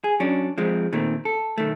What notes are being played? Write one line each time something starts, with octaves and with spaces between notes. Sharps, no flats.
G#4
F#3 C#4 D4
F3 G#3 C4
A#2 D#3 A3 C4
A4
B1 D#3 A3